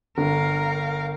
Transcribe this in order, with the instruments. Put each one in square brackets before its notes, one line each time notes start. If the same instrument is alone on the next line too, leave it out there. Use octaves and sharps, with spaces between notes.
[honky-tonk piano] G1 [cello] A#4 F5